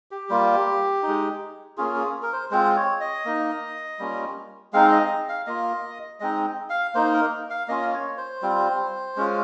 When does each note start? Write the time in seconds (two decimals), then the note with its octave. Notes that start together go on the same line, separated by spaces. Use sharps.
0.11 G4
0.30 G3 A#3 F4
1.03 D#4
1.08 G#3
1.77 A#3 C#4 F4 G#4
1.96 G#4
2.22 A#4
2.33 C5
2.51 G#3 C4 F4 C5
2.76 C#5
3.00 D#5
3.25 A#3 D#4
3.99 G3 A#3 C#4 F4
4.73 G#3 C4 D#4 F5
4.92 D#5
5.29 F5
5.47 A#3 F4 D#5
6.20 G#3 C4 D#4 D#5
6.70 F5
6.95 A#3 D#4 C5
7.13 A#4
7.50 F5
7.68 A#3 C#4 F4 D#5
7.93 C#5
8.18 C5
8.42 G3 C4 F4
9.16 G#3 C#4 F4